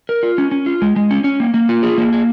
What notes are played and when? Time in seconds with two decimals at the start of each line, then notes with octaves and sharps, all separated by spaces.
0.09 A#4
0.23 F4
0.38 C#4
0.51 C#4
0.66 F4
0.82 G#3
0.96 G#3
1.11 C#4
1.24 C#4
1.40 A#3
1.54 A#3
1.69 F4
1.83 G#4
1.98 A#3
2.12 G#4